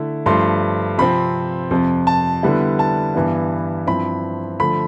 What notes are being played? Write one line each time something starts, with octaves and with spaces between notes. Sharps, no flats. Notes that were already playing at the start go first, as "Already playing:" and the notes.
Already playing: D3 A3 E4
G2 F3 A3 C6
C3 F3 C4 B5
F2 C3 F3
A5
D3 G3 B3 E4
A5
G2 E3 B3 E4
G2 F3 C4 E4 B5
D3 F3 A3 B5